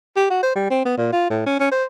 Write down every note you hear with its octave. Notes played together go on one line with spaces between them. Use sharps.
G4
F#4
C5
G3
C4
B3
A#2
F4
A2
C#4
C#4
C5